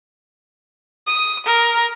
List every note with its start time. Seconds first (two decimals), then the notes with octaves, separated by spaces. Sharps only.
1.06 D#6
1.46 A#4